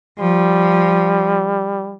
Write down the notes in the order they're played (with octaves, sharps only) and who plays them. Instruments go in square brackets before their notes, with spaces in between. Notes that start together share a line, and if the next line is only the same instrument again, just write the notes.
[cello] F3 [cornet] G3